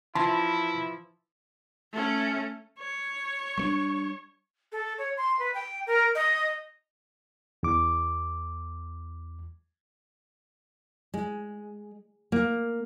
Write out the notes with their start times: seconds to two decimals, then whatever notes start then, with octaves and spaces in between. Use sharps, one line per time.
0.15 E3 F3 E4 A5 B5 C6
1.93 A3 C#4
2.79 C#5
3.58 G3 A#3 D4 C#6
4.72 A4
4.98 C#5
5.17 C6
5.39 B4
5.54 G5
5.86 A#4
6.15 D#5
7.63 E2 D6
11.14 G#3
12.32 A#3